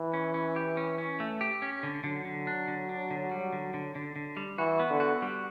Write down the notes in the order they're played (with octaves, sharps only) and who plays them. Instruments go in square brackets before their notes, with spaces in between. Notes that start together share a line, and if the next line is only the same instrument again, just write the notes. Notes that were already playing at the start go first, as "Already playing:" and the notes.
Already playing: [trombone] E3
[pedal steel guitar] C#4
C#4
G4
C#4
C#4
A3
G4
C#4
D3
[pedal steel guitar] D3 [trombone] F#3
[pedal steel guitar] D3
D4
D3
D4
D3
G3
D3
D3
D3
D3
G3
[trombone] E3 [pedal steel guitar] F#4
[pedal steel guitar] B3
[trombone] D3
[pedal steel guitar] F#4
G3